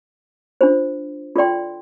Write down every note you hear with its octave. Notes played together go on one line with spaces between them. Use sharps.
D4 F4 C5
F4 A4 D5 G5 C6